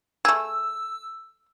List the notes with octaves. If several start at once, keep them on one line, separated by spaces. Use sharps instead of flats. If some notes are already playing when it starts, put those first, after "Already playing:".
A3 G#4 E6